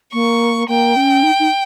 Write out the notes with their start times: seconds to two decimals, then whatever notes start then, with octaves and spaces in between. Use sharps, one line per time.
0.13 A#3 C#6
0.68 A#3 G5
0.96 C#4
1.23 D#4
1.39 D#4